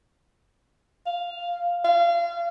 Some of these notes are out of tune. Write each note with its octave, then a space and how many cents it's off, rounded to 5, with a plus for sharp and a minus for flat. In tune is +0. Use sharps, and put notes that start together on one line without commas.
F5 +5
F5 -30